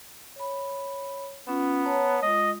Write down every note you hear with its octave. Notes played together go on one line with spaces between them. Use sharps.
C#5 B5
B3 C#4 F4
C#5 A5 A#5
G#3 F4 D#5